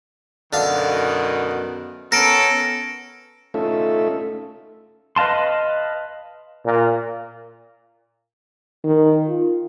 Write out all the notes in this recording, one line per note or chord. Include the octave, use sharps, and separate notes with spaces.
F#2 B2 D3 D#3 F5
B3 C#4 A4 A#4 A#6 D7
A3 C#4 D#4 F4 A4 E5
B4 D#5 F5 A5 C6
A#2
D#3
F4